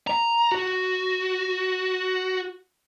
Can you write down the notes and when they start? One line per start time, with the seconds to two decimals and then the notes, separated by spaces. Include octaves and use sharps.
0.07 A#5
0.52 F#4